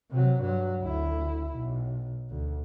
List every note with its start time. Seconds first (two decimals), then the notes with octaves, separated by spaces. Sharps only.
0.11 C3 F#3
0.41 G2 F#3
0.81 D2 E4
1.54 B1
2.30 D2